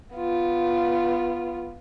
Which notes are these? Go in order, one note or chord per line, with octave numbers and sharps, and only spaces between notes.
B3 F4